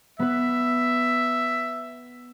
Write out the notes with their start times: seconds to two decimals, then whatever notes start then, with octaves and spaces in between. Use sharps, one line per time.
0.19 B3 B4 E5